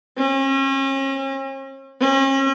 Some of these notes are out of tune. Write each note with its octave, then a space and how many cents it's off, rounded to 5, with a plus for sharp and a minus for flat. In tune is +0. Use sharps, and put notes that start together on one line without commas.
C#4 -40
C#4 -40